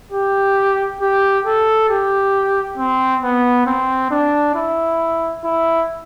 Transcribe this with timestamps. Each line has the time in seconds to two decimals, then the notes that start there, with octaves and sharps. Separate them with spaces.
0.12 G4
1.01 G4
1.45 A4
1.89 G4
2.77 C4
3.23 B3
3.66 C4
4.11 D4
4.55 E4
5.44 E4